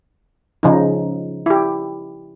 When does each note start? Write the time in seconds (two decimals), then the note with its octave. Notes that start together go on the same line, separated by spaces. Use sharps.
0.63 C#3 F3 D#4
1.46 E4 G4